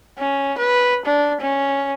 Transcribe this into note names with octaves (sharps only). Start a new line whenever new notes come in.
C#4
B4
D4
C#4